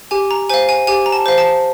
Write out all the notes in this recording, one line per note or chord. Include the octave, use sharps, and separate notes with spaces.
G4 G#5
A#5
C5 F5 G#5
G#5
G4 G#5
A#5
A5
C5 F5
A5